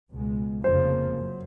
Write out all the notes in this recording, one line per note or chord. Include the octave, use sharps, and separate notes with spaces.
C#2 B2 G#3
F1 F2 C#3 F3 A#3 C5
F#2